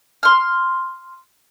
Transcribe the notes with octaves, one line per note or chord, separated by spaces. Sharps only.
C6 F6